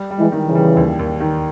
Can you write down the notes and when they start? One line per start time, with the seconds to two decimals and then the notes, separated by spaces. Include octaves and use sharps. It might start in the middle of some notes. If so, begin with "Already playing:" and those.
Already playing: G3
0.11 G3
0.18 E3 G#3
0.32 D#3
0.47 C#3 E3
0.55 G3
0.77 D#2
0.99 D#2
1.21 D#3